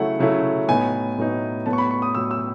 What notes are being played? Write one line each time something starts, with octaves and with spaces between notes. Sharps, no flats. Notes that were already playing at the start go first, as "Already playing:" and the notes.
Already playing: C#3 F#3 A3 E4 F#5
C#3 F#3 A3 E4
A2 F#3 B3 D#4 G#5
A2 F#3 B3 D#4
A2 F#3 B3 A5
C#6
B5
C#6
D#6
A2 F#3 B3 E6
E6